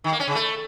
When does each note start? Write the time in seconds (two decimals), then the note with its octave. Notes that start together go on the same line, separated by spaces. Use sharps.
0.04 D#3
0.12 A#3
0.20 C#4
0.27 C#3
0.35 A3